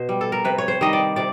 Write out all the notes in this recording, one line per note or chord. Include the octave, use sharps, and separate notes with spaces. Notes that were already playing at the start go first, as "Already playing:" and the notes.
Already playing: B2 C5
G3
A4
A#4
C3 B4
C#5
C5
D#3 G3 D#5
D5
C3 D5